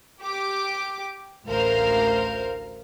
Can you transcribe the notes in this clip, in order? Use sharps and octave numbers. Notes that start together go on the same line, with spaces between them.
G4 D6
A1 D2 A#4 C5 F5